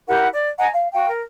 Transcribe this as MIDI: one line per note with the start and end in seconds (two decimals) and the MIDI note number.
0.07 0.26 64
0.07 0.26 67
0.07 0.26 70
0.07 0.26 78
0.32 0.48 74
0.58 0.68 75
0.58 0.68 78
0.58 0.68 80
0.58 0.68 82
0.74 0.88 77
0.93 1.07 66
0.93 1.07 77
0.93 1.07 79
1.09 1.20 70